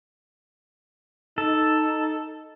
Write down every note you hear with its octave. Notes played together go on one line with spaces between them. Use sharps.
D#4 A4